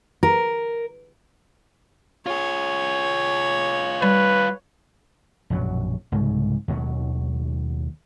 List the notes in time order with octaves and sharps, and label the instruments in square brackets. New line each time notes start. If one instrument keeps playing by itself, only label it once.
[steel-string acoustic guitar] A#4
[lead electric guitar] F4 G#4 [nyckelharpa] C#5
[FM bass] G3 [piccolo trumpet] B4
[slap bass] A#1 F#2 B2 F#3
C2 G#2 C#3
D#2 B2 D#3 F#3